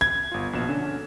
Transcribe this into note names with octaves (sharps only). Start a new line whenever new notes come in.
G#6
G1 F4
A#1 B2 E7
D3 C#4 D4